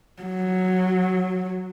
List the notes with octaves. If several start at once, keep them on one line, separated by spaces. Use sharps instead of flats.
F#3